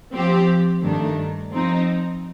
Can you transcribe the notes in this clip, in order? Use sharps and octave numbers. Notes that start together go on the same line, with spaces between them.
F3 C4 G4
G2 D#3 A3 D4
F3 C4 D#4